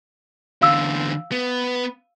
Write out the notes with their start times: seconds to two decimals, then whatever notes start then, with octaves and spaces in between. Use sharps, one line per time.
0.62 E2 D3 F5 E6
1.32 B3